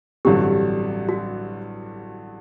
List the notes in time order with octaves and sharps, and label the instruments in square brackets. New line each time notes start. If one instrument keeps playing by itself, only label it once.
[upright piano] A1 G2 D3 F#3 C4 [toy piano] G4
[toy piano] F#4